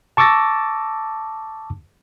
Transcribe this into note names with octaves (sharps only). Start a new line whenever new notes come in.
A5 C#6 D6 E6 A6 A#6